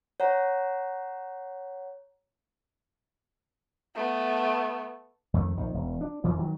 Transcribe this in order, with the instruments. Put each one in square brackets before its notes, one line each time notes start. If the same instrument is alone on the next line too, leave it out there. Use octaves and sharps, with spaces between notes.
[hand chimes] C#5 F#5 A#5
[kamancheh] A3 B3
[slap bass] F2 D#3 A3
A#1 D#3
E1
D4
F2 D#3 E3 A#3
D#3 F#3